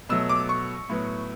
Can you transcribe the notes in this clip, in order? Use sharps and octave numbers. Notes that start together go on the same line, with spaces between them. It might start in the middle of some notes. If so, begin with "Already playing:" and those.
B2 F#3 A3 E6
D6
C#6
A2 F#3 B3